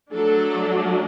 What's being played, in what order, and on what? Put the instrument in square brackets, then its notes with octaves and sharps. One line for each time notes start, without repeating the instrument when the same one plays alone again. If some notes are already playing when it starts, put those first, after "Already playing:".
[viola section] F#3 A3 D4 A4